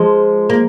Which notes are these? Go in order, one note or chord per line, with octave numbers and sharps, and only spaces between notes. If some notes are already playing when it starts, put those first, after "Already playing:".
Already playing: F3 G#3
A#3